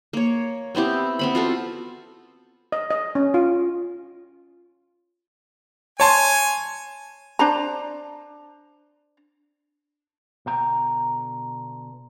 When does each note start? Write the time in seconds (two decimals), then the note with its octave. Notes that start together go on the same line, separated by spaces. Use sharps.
0.13 A#3 C#5
0.75 B3 C4 E4 G4
1.19 B3 C4 B5
1.35 F4 F#4 A4 C5
2.72 D#5
2.91 D#5
3.15 C#4
3.34 F4
6.00 C#5 G#5 A5 C6
7.39 D4 C5 A5 A#5
10.46 B2 D3 G5 A#5